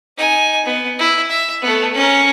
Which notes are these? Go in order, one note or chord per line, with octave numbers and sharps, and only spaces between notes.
D#4 G#5
B3
E4
E5
A3 B3
C#4 A#4